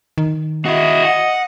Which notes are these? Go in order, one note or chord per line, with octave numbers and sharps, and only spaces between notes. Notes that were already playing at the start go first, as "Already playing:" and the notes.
D#3
E4 F#4 D#5
F#5